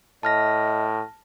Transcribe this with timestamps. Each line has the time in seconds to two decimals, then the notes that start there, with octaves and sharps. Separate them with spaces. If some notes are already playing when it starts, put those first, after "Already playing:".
0.23 A2 D#5 A5 F6 A#6